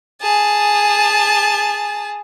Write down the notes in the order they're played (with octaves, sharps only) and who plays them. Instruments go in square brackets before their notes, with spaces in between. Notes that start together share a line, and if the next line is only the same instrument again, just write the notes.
[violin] G#4 A5